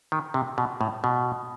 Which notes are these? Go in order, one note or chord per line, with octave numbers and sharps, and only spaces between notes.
D#3
C3
B2
A2
B2